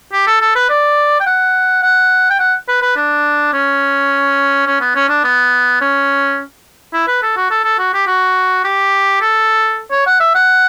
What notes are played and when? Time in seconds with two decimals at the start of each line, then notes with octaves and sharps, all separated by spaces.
0.13 G4
0.27 A4
0.41 A4
0.55 B4
0.69 D5
1.20 G5
1.26 F#5
1.83 F#5
2.30 G5
2.39 F#5
2.68 B4
2.82 B4
2.96 D4
3.53 C#4
4.67 C#4
4.81 B3
4.95 C#4
5.09 D4
5.24 B3
5.81 C#4
6.93 E4
7.07 B4
7.23 A4
7.37 F#4
7.51 A4
7.64 A4
7.79 F#4
7.94 G4
8.07 F#4
8.64 G4
9.21 A4
9.91 C#5
10.06 F#5
10.20 E5
10.35 F#5